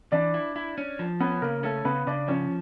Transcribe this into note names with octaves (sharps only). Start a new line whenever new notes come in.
E3 D4 D5
E4
E4
C#4
F3
B3 C#4 B4
C#3 A#3 A#4
A3 C#4 A4
C#3 B3 B4
C#3 D4 D5
F3 C#4 C#5